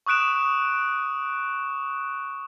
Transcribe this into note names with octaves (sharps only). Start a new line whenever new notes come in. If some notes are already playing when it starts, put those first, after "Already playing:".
C#6 D#6 F#6 D7 E7